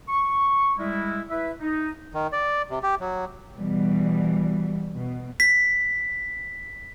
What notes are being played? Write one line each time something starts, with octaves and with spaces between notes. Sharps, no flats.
C#6
G3 G#3 E4
E4 B4 E5
D#4
D#3
D5
C3
G4
F#3
B2 E3 G3
B2
B6